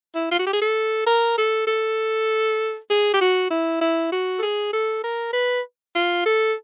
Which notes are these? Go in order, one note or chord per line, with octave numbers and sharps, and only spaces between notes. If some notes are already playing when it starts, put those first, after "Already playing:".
E4
F4
F#4
G4
G#4
A4
A#4
A4
A4
G#4
G4
F#4
E4
E4
F#4
A4
G#4
A4
A#4
B4
F4
A4